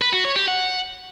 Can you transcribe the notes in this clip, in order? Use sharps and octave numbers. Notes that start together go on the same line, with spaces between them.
B4
F#4
C#5
G4
F#5